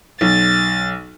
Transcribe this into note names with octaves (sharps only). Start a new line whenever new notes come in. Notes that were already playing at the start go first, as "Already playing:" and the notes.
B1 A6